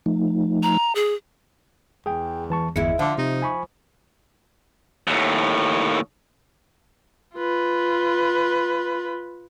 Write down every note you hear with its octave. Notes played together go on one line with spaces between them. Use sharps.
F3 A3 D#4
A#5
G#4
E2 G#4 G5
E3 A5 C#6
G1 E2 G#3 E4 C#7
D3 F3 F5 D6
C3 D#4
G#5 B5 C#6
D#2 A2
F4 B4